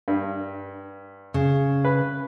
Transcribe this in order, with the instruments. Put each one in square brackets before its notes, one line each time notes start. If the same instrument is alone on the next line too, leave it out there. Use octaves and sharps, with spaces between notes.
[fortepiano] G2
[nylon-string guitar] C#3
[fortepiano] B4